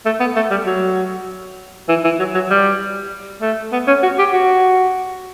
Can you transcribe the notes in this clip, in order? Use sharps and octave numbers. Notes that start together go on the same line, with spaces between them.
A3
B3
A3
G3
F#3
E3
E3
F#3
F#3
G3
A3
B3
C#4
F#4
G4
F#4